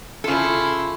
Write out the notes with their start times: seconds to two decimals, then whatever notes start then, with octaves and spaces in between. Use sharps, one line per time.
0.24 C#3 E4 F4 A4